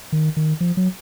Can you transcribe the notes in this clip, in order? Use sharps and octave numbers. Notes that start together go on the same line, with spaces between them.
D#3
D#3
F3
F#3